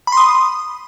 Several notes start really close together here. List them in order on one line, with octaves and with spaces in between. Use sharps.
B5 C6 D#6